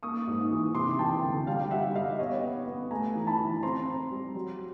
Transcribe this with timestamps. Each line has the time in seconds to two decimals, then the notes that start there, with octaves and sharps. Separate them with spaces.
0.03 A#3 C#6 D#6
0.27 G#2
0.51 E3
0.74 C3 C6 D6
0.99 E3 G5 A5
1.23 D2
1.47 G3 F5 G5
1.71 G3 E5 F#5
1.95 G3 D#5 F5
2.19 B3 C#5 D#5
2.42 B3
2.67 B3
2.91 A3 G#5 A#5
3.15 E3
3.27 A5 B5
3.39 E3
3.63 C4 A#5 C6
3.87 C4
4.11 G3
4.35 F#3